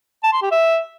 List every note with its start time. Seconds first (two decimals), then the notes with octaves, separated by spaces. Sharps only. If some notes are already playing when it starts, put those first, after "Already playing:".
0.23 A5
0.33 C6
0.42 G4
0.51 E5